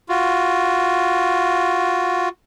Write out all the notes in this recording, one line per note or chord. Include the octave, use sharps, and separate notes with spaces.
F4 F#4